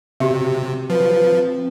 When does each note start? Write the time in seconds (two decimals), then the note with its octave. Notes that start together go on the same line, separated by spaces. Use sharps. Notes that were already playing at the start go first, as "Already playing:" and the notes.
0.20 C3 C4 F#4 G4 E5
0.90 F3 B4